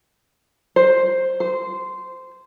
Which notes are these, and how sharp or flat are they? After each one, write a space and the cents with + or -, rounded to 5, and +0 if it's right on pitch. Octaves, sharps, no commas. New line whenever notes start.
C5 +5
C5 -15